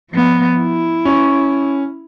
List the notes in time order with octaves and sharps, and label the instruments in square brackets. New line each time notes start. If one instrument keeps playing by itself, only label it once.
[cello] F3 B3
E4
[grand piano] C#4